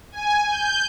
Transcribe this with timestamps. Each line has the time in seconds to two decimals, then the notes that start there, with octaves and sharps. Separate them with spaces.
0.12 G#5
0.48 G6